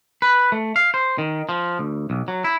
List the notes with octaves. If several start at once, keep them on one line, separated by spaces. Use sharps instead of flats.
B4
A3
F5
C5
D#3
F3
D2
B1
F#3
E4